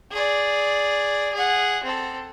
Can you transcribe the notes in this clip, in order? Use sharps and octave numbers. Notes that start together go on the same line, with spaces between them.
G#4 D5
G#4 F#5
C4 A4